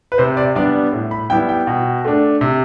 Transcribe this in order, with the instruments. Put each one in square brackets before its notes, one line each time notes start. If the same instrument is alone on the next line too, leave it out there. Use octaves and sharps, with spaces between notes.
[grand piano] B4
C3 C5
D5
G3 B3 D4 D5
A2
B5
G3 B3 E4 G5
G5
B2
A3 D4
C3